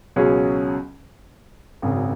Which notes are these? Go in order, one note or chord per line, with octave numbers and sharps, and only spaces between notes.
C#2 B2 F#3 C#4 G#4
G#1 F#2 C#3